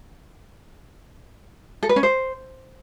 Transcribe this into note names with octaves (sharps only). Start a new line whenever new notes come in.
A4
B4
C#4
C5